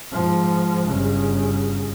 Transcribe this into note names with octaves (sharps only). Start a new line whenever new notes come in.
G#2 F3
G1 C#3